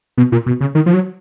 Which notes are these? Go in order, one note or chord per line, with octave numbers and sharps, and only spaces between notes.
B2
A#2
B2
C#3
D#3
F3
F#3